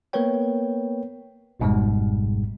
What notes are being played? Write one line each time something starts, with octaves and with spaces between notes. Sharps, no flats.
A#3 B3 A#4 B4 C#5 G5
G#1 F2 G#2 B2 G3 G#3